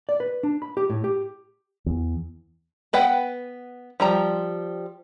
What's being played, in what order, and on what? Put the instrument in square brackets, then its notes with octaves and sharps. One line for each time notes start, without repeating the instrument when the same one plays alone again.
[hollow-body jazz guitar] D5
B4
D4
B5
G4
A2
G4
[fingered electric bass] E2
[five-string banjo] B3 B4 F#5 G5
F3 G3 A#5